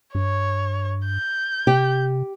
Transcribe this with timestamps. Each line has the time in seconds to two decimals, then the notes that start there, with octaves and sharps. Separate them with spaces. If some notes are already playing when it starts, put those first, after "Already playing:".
0.15 G2 C#5
1.07 G6
1.67 C3 G4